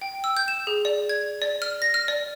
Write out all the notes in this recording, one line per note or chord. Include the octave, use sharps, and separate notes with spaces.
G5
E6
G6
E7
G#4
D5
G#6
D5
F6
A#6
F6
D5